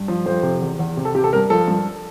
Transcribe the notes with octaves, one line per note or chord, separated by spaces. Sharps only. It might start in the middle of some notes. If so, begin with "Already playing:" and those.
Already playing: G2
F3
F2 C5
C3
E2
E2
C3
A4
C3 G4
A4
G2 A#4
F3 A4
G2